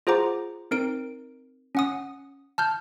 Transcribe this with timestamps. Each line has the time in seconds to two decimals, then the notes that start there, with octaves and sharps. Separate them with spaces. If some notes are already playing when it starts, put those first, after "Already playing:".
0.07 F4 G#4 C5 F#5 A#5 D6
0.71 C4 D#4 A#4 D7
1.75 C#4 F#5 D#6
2.58 A5 F6 G6